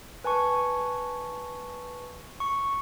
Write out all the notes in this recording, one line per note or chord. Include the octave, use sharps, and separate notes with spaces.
B4 G#5 A5 C#6
C#6